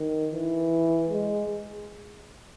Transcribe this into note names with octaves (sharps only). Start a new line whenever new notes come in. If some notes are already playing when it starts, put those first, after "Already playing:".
Already playing: D#3
E3
G#3